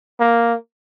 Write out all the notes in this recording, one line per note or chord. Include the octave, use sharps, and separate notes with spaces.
A#3